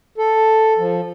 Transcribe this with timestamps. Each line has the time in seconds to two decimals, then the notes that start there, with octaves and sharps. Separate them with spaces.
0.18 A4
0.78 F3